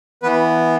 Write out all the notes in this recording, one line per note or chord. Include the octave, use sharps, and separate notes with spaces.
E3 B3 B4